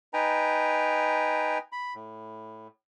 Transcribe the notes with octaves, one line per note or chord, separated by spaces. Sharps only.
D#4 B4 G5 G#5 A#5
B5
A2